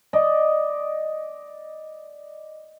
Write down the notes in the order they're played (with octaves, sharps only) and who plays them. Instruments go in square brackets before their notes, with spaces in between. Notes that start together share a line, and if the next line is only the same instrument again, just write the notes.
[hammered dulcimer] D5 D#5